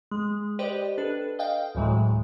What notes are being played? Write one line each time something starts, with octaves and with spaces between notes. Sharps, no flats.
G#3
G4 B4 C5 D5 D#5 G5
D4 A4 B4
D#5 F5 G5
D2 A2 E3 F#3 G#3